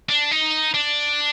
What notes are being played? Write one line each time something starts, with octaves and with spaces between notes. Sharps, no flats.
D4
D#4
D4